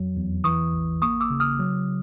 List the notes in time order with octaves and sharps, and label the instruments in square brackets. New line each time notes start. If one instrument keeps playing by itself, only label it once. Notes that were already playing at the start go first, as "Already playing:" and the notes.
Already playing: [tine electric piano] F2 F#3
E2
[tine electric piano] E3 [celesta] C#6 D#6
[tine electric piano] A1
[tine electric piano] A#3 [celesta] C#6 D#6
[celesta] D6 E6
[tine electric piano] C#3
[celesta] D#6 F6
[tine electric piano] F#3